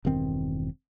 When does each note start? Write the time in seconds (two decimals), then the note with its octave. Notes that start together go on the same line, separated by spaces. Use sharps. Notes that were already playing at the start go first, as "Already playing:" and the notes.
0.05 E1 G2 D#3 C4